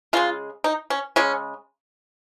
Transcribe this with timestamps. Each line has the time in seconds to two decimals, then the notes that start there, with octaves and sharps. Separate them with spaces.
0.13 C#3 G#3 F4
0.64 D#4
0.90 C#4
1.16 C#3 G#3 C#4